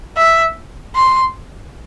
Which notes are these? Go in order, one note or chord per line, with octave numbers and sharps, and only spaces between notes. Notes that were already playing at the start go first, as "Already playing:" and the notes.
E5
C6